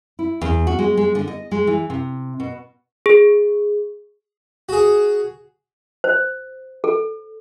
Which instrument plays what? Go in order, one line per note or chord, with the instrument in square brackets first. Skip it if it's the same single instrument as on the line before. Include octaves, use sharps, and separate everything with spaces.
[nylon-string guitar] E4
E2
F#4
G#3
G#3
D3
D#5
G#3
E3
C3
B2
[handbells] G#4
[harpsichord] F#4 G#4
[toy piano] C5
A4